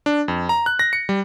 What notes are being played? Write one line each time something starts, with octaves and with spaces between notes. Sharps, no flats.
D4
F2
A#5
F#6
A#6
C#7
G3